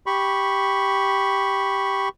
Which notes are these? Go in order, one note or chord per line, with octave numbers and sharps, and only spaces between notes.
G4 B5 C#6